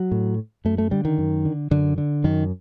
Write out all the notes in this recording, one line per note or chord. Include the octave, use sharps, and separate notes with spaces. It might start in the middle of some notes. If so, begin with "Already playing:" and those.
Already playing: F#3
A2
F#2 A3
A3
D3 G3
D#3
F#2
D3
F#2 D3
D3
F#2 D#3